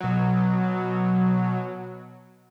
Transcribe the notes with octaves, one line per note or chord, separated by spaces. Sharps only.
B2 F#3